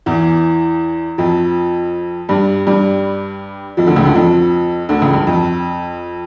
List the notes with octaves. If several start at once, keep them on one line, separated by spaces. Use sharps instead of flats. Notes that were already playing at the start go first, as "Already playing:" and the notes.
E2 E3
F2 F3
G2 G3
G2 G3
F2 F3
D2 D3
C#2 C#3
D2 D3
F2 F3
D2 D3
C#2 C#3
G2
F2